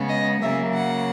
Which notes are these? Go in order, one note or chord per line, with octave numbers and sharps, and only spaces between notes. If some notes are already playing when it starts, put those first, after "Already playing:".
Already playing: C#3 G#3 B3
D#5
C#3 F#3 A#3 E5
F#5